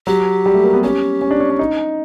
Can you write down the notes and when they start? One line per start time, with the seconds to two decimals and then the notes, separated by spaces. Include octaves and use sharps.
0.07 F#3 G4
0.46 G3
0.55 A3
0.64 A#3
0.74 B3
0.83 C#4 G4
1.21 C#4
1.31 D4
1.40 C#4
1.50 D4
1.59 D#4